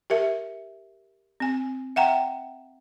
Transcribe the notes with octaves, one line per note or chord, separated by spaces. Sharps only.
G4 A#4 E5
C4 G#5
E5 F#5 G5 A#5